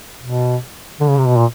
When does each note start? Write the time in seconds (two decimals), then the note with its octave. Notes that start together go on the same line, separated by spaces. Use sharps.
0.23 B2
1.00 D3
1.09 C#3
1.18 C3
1.27 B2
1.37 A#2